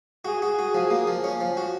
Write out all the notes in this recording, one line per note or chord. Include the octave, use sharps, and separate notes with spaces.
F#4 G#4
F#4
F#4
F3
A#3
F3
C#4
F3
F#4